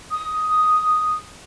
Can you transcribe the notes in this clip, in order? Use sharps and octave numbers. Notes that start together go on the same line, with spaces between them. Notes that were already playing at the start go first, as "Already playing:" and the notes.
D#6